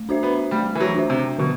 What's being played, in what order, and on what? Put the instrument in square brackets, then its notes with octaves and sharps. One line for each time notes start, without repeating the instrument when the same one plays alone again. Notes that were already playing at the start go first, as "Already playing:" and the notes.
Already playing: [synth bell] A3
D4 F#4 C5 E5
[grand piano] B3
[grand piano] G3 [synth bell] A3
[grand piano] E3
F#3
[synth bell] D4 F#4 C5 E5
[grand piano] C3
[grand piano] B2 [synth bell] D3